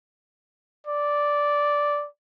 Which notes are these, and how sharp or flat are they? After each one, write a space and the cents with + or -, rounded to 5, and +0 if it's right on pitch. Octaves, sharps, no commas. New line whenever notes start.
D5 -5